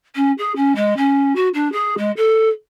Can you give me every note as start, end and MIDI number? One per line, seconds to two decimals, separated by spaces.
0.15 0.31 61
0.38 0.52 68
0.56 0.73 61
0.75 0.96 56
0.97 1.33 61
1.35 1.48 66
1.54 1.70 62
1.72 1.94 68
1.98 2.11 56
2.17 2.48 69